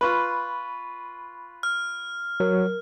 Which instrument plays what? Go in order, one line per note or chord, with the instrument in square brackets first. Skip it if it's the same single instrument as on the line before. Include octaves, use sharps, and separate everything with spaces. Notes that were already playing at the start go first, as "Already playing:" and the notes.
[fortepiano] F4 B4 [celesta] B5 C#6
[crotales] F6
[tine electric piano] F#3 [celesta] A#4